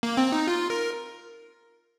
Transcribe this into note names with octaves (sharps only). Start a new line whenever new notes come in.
A#3
C4
D#4
F4
A#4